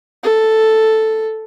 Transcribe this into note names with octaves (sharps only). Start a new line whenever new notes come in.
A4